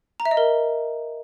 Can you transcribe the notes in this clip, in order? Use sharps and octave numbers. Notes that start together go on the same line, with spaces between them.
A#5
E5
D#5
A#4